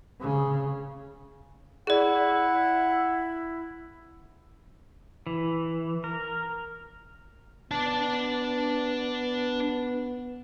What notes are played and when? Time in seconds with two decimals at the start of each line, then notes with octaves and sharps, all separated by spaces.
0.21 C#3
1.87 E4 G#4 D5 F#5
5.27 E3
6.04 A#4
7.71 B3 D4 A5